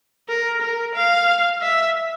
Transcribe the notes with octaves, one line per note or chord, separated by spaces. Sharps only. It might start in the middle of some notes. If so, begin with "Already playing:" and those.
A#4
A#4
F5
E5